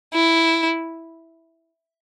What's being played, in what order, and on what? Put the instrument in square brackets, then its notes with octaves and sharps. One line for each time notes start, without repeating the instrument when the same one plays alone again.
[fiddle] E4